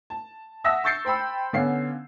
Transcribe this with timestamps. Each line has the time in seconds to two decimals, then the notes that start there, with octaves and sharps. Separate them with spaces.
0.10 A5
0.64 E5 F#5 A5 D#6 E6 A#6
0.84 C#6 E6 G6 A6 C7 C#7
1.05 C5 G5 B5 E6
1.53 D3 B3 C#4 F5 C7